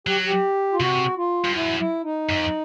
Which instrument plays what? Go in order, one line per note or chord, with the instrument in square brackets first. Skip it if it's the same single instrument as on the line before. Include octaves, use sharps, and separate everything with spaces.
[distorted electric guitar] F#3 [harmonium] G4
[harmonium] G4
F4
[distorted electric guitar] C3 [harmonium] F#4
[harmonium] F4
[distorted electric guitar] G2
[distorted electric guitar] F#2 [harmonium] E4
[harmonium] E4
D#4
[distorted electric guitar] F#2
F2